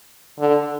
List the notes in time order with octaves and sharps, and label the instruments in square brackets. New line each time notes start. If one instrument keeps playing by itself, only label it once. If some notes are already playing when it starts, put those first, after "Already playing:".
[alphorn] D3